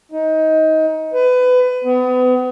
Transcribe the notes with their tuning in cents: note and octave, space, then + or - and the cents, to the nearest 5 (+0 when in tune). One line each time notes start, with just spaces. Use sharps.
D#4 +20
B4 +25
B3 +35